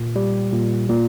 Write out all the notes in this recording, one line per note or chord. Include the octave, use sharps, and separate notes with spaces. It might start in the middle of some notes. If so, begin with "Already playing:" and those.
Already playing: A#2
G3
A#2
A#2